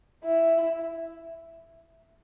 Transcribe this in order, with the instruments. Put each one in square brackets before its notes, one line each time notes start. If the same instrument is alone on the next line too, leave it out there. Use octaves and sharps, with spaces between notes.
[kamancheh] E4